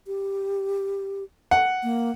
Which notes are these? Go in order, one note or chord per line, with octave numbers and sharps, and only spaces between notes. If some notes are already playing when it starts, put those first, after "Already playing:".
G4
F#5
A#3